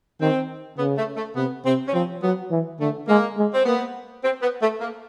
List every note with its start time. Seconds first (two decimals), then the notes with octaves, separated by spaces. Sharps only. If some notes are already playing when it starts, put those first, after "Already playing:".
0.21 D#3 C4
0.78 C#3 B3
0.98 A3
1.17 A3
1.36 C3 B3
1.65 C3 C4
1.88 C#4
1.94 F3 C4
2.22 F#3 B3
2.51 E3
2.80 D3 A3
3.08 G#3 A#3
3.37 G#3
3.54 C4
3.66 A#3 B3
4.24 C4
4.43 B3
4.62 A3
4.81 A#3